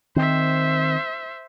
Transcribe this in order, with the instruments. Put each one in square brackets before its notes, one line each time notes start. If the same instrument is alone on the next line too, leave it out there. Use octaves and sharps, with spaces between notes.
[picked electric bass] D#3 C4 [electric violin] C5 E5